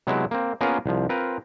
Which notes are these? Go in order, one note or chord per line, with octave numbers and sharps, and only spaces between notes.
C3 F#3 G#3 B3 C4 E4
A#3 C4
A#3 B3 C#4 F4 G#4 A#4
C2 F3
C4 F4 A#4 B4